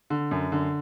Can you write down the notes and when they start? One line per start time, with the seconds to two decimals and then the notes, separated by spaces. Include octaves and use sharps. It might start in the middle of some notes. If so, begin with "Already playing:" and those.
0.10 D3
0.31 F#2
0.52 D3